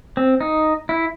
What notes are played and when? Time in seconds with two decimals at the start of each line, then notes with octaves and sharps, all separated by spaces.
0.17 C4
0.41 D#4
0.89 E4